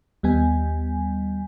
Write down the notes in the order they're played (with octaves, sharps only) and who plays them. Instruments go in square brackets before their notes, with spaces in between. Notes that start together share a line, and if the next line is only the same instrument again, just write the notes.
[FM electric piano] D#2 G3 B3 G#5